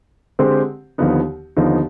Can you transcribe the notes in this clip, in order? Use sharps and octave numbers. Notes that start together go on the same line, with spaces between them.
D3 G#3 C4 G4 C5
D#2 D3 F3 B3 D#4
D#2 D3 F3 B3 D#4